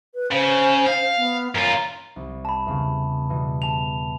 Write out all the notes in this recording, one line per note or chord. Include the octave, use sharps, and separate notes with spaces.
B4
C#3 C5
F5
B3
F#2 F4 A#5
C2
A5 B5
E2 C#3
B2 E3 G3
A5 F7